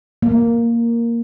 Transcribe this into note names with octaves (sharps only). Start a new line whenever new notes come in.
A#3